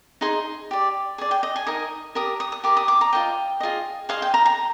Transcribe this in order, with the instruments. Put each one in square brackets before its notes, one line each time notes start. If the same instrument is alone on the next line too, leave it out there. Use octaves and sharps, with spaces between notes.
[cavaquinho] D#4 G#4 D#5 C6
G4 D5
G#4 D5
G5
D#5
G#5
D#4 A#4 D#5 D#6
G4 A#4 D5 D#6
D#6
D#6
G4 A#4 D5 D6
D#6
D6
A#5
F4 C5 D#5 G5
F4 G#4 D#5
G#4 C5 D#5 F5
G5
A#5
A#5